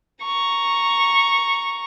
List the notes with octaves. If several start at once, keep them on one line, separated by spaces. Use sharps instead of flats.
A#5 C#6